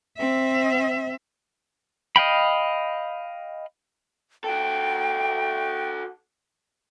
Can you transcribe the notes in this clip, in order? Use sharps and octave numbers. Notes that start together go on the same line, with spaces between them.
C4 E5
D#5 F5 G5 B5
F#4 A4 G5